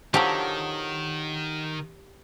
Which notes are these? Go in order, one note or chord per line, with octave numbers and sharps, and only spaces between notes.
D3 D#3 F3 F#3 G4